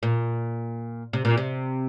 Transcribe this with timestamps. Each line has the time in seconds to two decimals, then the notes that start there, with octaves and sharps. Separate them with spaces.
0.03 A#2
1.13 C3
1.25 A#2
1.37 C3